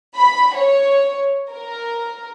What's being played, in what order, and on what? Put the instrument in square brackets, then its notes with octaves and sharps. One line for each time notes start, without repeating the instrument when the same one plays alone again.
[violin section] B5
C#5
A#4